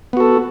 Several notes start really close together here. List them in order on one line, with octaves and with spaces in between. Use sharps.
B3 F#4 A4